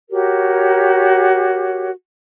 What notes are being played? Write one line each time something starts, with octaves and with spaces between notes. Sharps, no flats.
F#4 G4 A#4 C#5